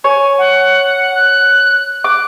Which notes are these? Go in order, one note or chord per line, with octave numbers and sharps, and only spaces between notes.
C#5 G#5
F#5
F#6
D6 F#6